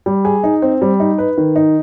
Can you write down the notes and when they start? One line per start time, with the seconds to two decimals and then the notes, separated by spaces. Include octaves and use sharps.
0.06 G3
0.25 G#4
0.44 D#4
0.62 C4
0.82 G3
1.00 D#4
1.18 B4
1.37 D#3
1.56 D#4